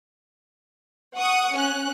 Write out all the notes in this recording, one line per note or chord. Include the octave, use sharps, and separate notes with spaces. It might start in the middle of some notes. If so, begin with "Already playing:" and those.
F#5 C#6 D#6
C#4 F#6